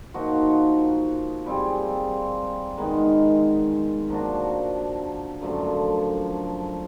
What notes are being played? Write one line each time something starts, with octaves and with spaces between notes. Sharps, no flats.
F3 A#3 D#4 F#4
G3 C4 F4 G#4
D#3 G#3 B3 D#4
F3 A#3 D4 F#4
F#2 D3 F3 A3